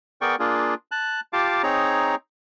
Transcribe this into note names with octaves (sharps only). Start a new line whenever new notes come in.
B3 G#4 A#4 D5 G5 C#6
A#3 D4 F4 G#4
A5 F#6
F4 G4 F5 A5 D6
C4 D#4 G#4 C#5 A#5